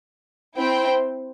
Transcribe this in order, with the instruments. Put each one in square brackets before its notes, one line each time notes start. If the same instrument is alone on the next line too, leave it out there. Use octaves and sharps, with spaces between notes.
[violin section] C4 E4 C5 G5